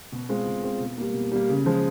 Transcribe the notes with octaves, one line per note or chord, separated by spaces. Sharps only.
B2
G#3 C4 F4
B2
G#3 C4 F4
B2
G3 A#3
B2
G3 A#3
C#3
F3 G#3